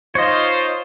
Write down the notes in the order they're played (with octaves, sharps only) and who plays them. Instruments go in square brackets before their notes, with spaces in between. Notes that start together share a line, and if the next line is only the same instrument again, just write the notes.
[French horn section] D#4 F4 C5 [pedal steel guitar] C#5 D#5